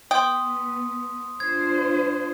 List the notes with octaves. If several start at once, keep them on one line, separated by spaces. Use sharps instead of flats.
B3 G5 C6 D#6
D4 F4 C5 G#6